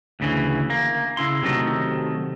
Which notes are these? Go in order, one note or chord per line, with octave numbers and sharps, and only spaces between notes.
D2 C#3 E3
A#3
C#3 E4 C6
C3 D#3 F#3 A3